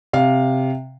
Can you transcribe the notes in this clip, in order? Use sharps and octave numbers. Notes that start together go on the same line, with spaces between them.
C3 F5